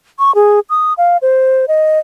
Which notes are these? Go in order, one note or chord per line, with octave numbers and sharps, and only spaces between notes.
C#6
G#4
D#6
F5
C5
D#5